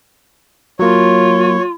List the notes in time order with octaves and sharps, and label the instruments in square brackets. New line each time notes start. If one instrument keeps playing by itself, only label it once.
[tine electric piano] F#3 A#3 [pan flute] F4 [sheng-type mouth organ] C#5